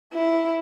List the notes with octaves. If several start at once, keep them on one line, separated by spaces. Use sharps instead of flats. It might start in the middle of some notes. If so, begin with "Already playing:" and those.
E4